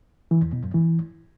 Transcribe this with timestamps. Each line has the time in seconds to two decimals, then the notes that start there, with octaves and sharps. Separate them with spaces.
0.31 E3
0.42 E2
0.53 B2
0.64 F#2
0.74 E3